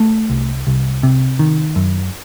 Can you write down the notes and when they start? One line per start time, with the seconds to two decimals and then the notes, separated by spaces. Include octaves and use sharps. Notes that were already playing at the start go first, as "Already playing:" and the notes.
Already playing: A3
0.30 C2
0.67 C2
1.03 C3
1.39 D#3
1.76 F#2